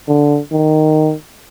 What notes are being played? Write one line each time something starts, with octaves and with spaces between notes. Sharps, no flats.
D3
D#3